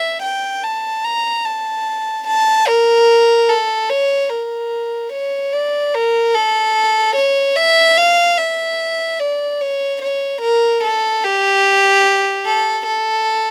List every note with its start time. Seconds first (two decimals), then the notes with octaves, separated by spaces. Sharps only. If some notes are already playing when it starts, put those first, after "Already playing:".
Already playing: E5
0.23 G5
0.64 A5
1.05 A#5
1.45 A5
2.27 A5
2.68 A#4
3.49 A4
3.89 C#5
4.30 A#4
5.13 C#5
5.53 D5
5.94 A#4
6.35 A4
7.16 C#5
7.56 E5
7.97 F5
8.38 E5
9.20 D5
9.61 C#5
10.02 C#5
10.41 A#4
10.83 A4
11.24 G4
12.46 A4
12.86 A4